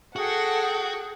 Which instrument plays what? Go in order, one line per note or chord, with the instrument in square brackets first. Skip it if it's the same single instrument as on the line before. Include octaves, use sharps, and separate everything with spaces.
[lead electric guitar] F#4 [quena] G#4 [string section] A4 F#5 G5